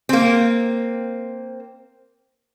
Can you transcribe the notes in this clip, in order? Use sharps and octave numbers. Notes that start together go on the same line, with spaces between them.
A#3 C4